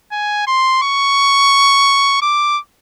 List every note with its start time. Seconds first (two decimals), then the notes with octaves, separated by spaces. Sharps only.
0.12 G#5
0.47 C6
0.82 C#6
2.22 D6